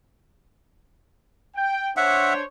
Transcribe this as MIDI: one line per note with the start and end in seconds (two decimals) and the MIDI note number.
1.56 1.90 79
1.97 2.44 62
1.97 2.44 72
1.97 2.44 73
1.97 2.33 76
1.97 2.33 78